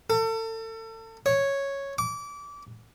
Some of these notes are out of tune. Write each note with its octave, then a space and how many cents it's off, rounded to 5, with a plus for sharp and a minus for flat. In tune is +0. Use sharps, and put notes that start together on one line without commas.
A4 +35
C#5 -5
D6 -25